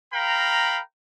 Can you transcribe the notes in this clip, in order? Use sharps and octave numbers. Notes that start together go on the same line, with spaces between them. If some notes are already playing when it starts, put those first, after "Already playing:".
A#4 F5 G5 A#5 B5